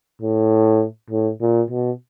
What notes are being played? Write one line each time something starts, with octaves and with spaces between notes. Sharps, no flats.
A2
A2
A#2
B2